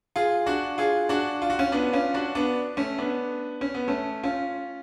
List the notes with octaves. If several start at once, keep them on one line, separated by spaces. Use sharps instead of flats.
F4 G#4
D4 F#4
F4 G#4
D4 F#4
F4
F#4
C#4 F4
B3 D4
C#4 F4
D4 F#4
B3 D4
A3 C#4
B3 D4
C#4
B3
A3 C#4
C#4 F4